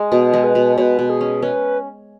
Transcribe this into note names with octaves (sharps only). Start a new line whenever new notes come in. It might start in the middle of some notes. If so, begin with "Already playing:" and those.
Already playing: G#3
B2 G#4
G#3
B4
B2
B2 B4 C#5
B2
G#4
C#4
C#4 B4